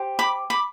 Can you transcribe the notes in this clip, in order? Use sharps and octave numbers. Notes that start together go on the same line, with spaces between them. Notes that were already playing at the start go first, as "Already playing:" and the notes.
Already playing: G4 C5
B5 D6
B5 D6